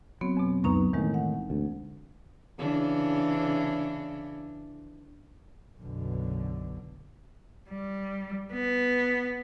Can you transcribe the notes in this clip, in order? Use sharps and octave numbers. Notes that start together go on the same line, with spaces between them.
F#3 B3 C4
F2 B2
C#2 F#2 B3 D#4 A#5 C#6
A2 D#3 E3 G#3
F#5
D2
C#3 E3 D4
B1 F#2 B2 D3
G3
B3